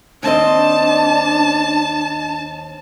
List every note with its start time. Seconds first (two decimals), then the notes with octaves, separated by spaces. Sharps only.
0.23 D#2 C4 D4 D#5 A5